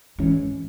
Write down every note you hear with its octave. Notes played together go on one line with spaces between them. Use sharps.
G#2 E3 G#3 C#4 E4